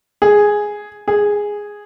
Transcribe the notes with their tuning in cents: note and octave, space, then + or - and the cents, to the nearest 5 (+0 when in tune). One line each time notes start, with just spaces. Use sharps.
G#4 +0
G#4 -5